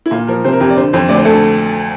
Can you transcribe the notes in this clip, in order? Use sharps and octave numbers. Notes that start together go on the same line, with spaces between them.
E4
A#2 F4
F3 A#4
C3 C5
A#4
F2 G4
D5
D3 C5
F2 C5
D2 D5
C5
D2 A4